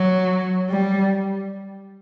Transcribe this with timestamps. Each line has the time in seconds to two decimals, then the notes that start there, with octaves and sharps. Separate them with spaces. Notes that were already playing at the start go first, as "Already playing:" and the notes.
Already playing: F#3
0.70 G3